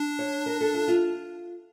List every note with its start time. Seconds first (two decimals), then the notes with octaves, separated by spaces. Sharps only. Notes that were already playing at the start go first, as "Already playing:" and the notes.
Already playing: D4
0.19 C#5
0.46 A#4
0.61 A4
0.74 F4
0.88 F4